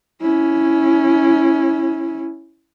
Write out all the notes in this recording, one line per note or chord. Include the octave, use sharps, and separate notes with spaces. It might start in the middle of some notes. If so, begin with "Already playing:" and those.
C#4 E4